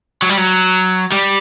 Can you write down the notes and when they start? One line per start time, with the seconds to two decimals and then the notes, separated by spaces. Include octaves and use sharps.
0.22 F#3
0.29 G3
0.38 F#3
1.12 G3